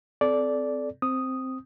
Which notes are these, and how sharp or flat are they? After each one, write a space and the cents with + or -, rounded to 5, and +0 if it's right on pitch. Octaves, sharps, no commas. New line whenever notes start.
C4 -25 A4 -25 D5 -10
C4 +0 D#6 +0